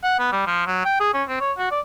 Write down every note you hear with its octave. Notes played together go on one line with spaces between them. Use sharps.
F#5
B3
G3
F3
F#3
G5
G#4
C#4
C4
C#5
F#4
D5